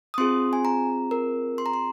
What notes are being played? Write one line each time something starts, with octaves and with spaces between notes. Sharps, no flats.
D#6
C4 F4 G#4 C6
G#5
A#5
A#4
C6
A#5
C6